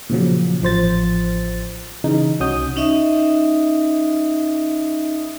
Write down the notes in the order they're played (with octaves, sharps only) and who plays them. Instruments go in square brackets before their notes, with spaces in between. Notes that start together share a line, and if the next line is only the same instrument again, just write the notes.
[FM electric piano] A#2 C#3 F3 F#3
A1 F3 C5 A6
C#3 E3 D#4
C2 C#4 F#4 D#6 G6
[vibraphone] C#4 D#4 D#5 E5 D#6